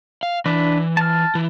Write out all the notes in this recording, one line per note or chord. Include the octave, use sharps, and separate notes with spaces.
F5
E3 D4 B4
A5 F6
E3